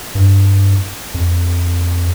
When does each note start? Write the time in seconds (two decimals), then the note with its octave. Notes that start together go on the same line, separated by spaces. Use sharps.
0.15 G2
1.14 F2